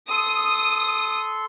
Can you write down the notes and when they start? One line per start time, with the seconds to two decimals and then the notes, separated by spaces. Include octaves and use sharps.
0.11 A4 C6 D#6